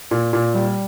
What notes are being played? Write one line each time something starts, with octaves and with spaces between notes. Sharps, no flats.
A#2
A#2
G3